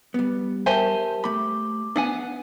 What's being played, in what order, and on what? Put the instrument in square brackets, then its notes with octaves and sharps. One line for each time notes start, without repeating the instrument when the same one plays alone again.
[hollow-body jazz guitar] G3 B3
[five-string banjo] G4 C5 G#5 [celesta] A#4 E5 A5
[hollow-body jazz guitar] A3 B5 [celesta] D6
[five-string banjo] B3 F#5 G#5 [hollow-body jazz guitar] D4